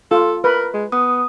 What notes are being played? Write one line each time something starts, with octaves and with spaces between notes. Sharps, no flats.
F4 A4
A#4 B4
G#3
B3 D#6